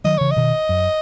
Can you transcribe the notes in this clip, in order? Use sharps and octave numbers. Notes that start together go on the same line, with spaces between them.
D#3 F#3 D#5
C#3 E3 C#5
D#5
B2 D#3
F#2